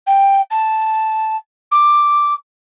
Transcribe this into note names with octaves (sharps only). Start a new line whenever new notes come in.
G5
A5
D6